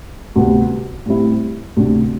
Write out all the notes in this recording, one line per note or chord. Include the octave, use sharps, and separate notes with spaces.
D2 C3 G3 B3
A2 G3 C4 E4
D2 C3 G3 D4